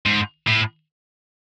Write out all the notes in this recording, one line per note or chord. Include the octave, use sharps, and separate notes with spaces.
G#2
A2